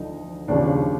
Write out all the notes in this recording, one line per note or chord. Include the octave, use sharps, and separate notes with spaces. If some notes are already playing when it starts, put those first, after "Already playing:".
Already playing: D2 D3 F3 D#4
D#2 C#3 F3 D4